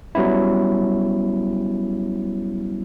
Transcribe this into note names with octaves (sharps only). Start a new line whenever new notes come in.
F#3 G3 B3 C#4 E4